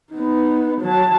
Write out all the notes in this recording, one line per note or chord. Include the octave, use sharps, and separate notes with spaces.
B3 D#4
F#3 A5